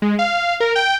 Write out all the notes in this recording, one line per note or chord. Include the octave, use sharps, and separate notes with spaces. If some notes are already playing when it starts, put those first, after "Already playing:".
G#3
F5
A#4
G5